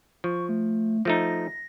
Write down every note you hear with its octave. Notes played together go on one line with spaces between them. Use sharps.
F3 C#6
A3
F3 A3 D#4 A#6